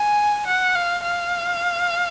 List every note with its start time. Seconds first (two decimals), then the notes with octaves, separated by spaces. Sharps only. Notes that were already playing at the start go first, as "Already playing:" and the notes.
Already playing: G#5
0.47 F#5
0.75 F5
1.03 F5